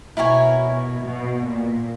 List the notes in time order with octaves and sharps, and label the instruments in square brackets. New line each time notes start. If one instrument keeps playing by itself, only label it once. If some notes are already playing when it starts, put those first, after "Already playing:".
[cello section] B2 [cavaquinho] E4 A#4 C#5 G#5
[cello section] B2
A#2